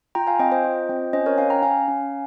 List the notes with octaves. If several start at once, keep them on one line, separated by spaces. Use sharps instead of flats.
F4 G5 A#5
F5 G#5
C4 D#5 G5
C5 D#5
F4
C4
C#4 C5 D#5
A#4 C#5
C#4 F5 G#5
G5 A#5
C#4 F5 G#5
C#4